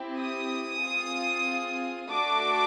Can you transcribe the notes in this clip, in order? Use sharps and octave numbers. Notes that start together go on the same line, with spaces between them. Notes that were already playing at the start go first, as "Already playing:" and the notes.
Already playing: C4 E4 G4
D#6
C4 F4 G#4
A3 D4 F#4 A4 D6